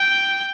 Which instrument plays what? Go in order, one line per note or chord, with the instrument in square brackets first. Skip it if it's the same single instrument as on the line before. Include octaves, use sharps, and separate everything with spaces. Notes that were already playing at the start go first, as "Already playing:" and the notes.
Already playing: [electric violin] G5